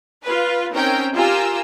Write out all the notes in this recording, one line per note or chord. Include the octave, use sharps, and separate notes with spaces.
F4 B4
C4 C#4 D#4 A#4 G5
F4 G4 A#4 G#5 A#5 E6